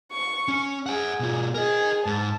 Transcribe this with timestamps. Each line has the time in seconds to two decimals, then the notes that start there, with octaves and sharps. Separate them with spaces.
0.12 C#6
0.48 C#4
0.86 G#4 F#5 G#5
1.20 B2 F4
1.54 G#4 A#4 D#5
2.06 G#2 A5